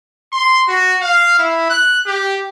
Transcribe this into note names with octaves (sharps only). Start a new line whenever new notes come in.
C6
F#4
F5
E4
F#6
G4